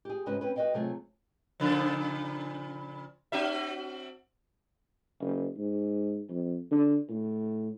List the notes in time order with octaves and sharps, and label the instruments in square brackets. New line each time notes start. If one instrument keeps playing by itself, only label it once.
[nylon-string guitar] G4 G#4
G#2 C#3 G#3 C#4 F#4 B4
C4 C#4 B4
F#4 B4 D5 D#5 F5 G5
C3 F#3 A3 F4 G#4
[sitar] A#2 C#3 F3
C4 F#4 E5
[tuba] F#1
G#2
F2
D3
A2